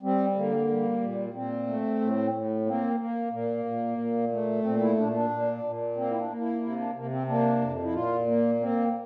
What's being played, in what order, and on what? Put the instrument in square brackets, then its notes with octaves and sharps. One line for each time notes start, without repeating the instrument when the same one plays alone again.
[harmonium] G3 C4
D3 A#3
G3
A#2
A#2 C4
A3
A2
A2
A#3 C4
A#3
A#2 A#3
A#2
A#2
A3
A#2 C4
E4
A#2 D4
D4
A#2
A#2
A#3 C4
E4
D4
A#3
E4
C3 E4
D4
C3 A#3
C4
A#3 D4
F2
E4
A#2 F4
A#3
A#3 C4